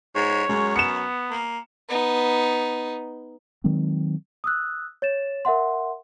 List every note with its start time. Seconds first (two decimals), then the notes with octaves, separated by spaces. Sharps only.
0.16 G#2 C#5
0.49 F#2 G#3
0.76 B3 C#7 E7
1.31 A#3
1.89 B3 D#4
3.64 D#3 F#3 G#3 C4
4.44 D#6 E6 F#6
5.02 C#5 A6 E7
5.45 A#4 E5 F#5 C6